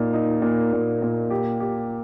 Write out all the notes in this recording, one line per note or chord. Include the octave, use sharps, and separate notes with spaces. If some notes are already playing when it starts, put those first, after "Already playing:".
Already playing: A#2 D#4
D#4
A#2
A#2
A#2
G4
G4